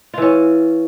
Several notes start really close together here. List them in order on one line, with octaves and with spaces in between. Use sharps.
F4 E3 C#4